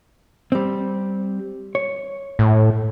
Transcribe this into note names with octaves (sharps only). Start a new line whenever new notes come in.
G3 C4
C#5
A2